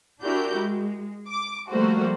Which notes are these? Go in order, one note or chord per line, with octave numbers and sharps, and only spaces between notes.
D4 E4 F#4 G4 A#4 G6
G#3
D6
F3 G3 A3 A#3 F#4 C5